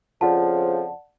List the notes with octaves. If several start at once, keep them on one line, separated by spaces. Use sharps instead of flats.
F2 C#3 F3 D5 F#5 A5